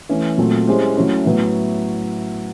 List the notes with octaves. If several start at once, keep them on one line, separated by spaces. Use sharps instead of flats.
E3 A3 C#4
A#2 F#3 A3 C4
G#3 C#4 E4 G4 C5
F#3 A3 C#4 E4
A2 F#3 B3 E4